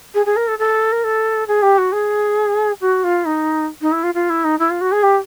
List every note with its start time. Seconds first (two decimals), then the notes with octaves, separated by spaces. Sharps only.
0.14 G#4
0.26 G#4
0.36 A#4
0.47 A4
0.58 A4
0.92 A#4
1.04 A4
1.47 G#4
1.62 G4
1.78 F#4
1.92 G#4
2.81 F#4
3.03 F4
3.25 D#4
3.81 D#4
3.92 E4
4.03 F4
4.14 F4
4.29 E4
4.44 D#4
4.59 E4
4.70 F4
4.81 F#4
4.91 G#4
5.03 G4